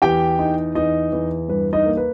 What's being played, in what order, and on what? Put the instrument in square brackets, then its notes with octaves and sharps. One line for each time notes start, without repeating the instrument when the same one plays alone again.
[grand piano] E2 G4 G5
D#4
E2 D#4 D#5
E2
G2 B4
D#4 D#5
A#3
B4